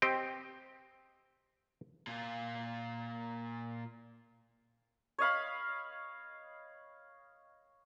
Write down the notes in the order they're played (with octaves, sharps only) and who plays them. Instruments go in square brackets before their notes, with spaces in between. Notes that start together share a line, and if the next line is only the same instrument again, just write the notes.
[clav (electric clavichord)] C4 G4 D#5 G5
[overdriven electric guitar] A#2 F4
[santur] C#5 D#5 F5 B5